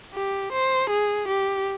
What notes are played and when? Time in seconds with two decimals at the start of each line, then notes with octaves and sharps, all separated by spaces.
0.15 G4
0.52 C5
0.90 G#4
1.28 G4